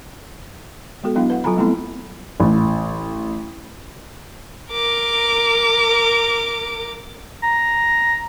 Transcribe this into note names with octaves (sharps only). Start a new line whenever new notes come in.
G#3 B3 F#4 A4
F#3 B3 D4 E4 F5
B4 F#5
F#3 F4 A4 G#5 A#5 B5
G3 A3 B3 C4 E4 A4
A1
A#4 D6
A#5